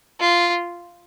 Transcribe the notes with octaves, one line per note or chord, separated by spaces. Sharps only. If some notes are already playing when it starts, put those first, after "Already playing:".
F4